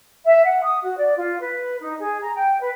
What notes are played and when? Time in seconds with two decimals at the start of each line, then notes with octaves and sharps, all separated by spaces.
0.24 E5
0.45 F#5
0.62 D#6
0.82 F#4
0.98 D5
1.16 F4
1.40 B4
1.81 D#4
1.99 G#4
2.20 A#5
2.35 G5
2.60 B4